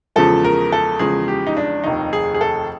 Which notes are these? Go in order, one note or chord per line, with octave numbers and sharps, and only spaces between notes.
E2 C#3 F3 G#3 A4
A#4
A4
E2 C#3 F3 G#3 G#4
G4
D#4
D4
F1 D#2 D#3 D#4
G#4
G#4
A4